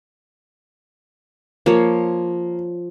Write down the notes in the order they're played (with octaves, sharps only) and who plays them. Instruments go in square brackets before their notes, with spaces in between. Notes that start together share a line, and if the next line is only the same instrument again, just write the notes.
[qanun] F3 C#5 [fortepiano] A#3